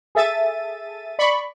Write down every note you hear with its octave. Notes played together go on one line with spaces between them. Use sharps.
G#4 A4 E5 A6 D#7
D5 B5 C#6